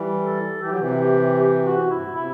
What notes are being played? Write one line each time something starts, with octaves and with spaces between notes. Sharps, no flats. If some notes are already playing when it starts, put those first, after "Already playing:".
Already playing: E3 G3
A4
E3 G4
F#3
C3 E3
G4
G4
F#4
G2 E4
A2
B2
C3 E4